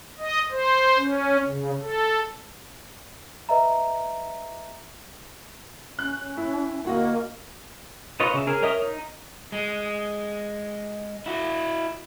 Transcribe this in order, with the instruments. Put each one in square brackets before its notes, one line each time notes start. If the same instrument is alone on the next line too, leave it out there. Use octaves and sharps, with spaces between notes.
[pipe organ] D#5
C5
C#4
C#3
A4
[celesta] B4 D#5 E5 A#5
[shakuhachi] C#4 [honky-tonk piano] F#6
[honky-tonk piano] E4
[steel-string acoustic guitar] D2 F#4 D#5 [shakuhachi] A#3
[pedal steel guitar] D#4 F4 B4 C#5 D#5
C#3 E5
C#4 G#4 A#4
A#4 C#5 D#5 E5 D#6
D#4
[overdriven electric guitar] G#3
E4 F#4